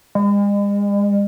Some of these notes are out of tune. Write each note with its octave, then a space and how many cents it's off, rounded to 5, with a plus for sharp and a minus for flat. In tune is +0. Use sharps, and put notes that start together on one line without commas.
G#3 -40